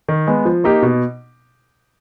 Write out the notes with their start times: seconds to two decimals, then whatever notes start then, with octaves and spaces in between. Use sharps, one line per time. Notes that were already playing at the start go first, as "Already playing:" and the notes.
0.08 D#3
0.27 G#3 B3
0.45 F3
0.64 A#3 D#4 G4
0.83 B2